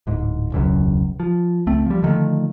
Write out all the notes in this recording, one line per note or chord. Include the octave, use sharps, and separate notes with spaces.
D1 G#2
E1 C#2 F#2
F3
C#2 A3 C4
F3 G3
D3 D#3 F3 A3